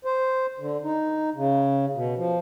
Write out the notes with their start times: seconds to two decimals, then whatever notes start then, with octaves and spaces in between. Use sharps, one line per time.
0.05 C5
0.60 D3
0.83 D#4
1.35 C#3
1.95 B2
2.17 F3